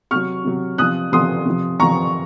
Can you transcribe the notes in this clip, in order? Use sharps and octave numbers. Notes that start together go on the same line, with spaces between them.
C3 F#3 C#6 F6
C3 F#3
C3 F3 D#6 F#6
C3 F3 C6 D#6
C3 F3
C3 F3 A#5 C#6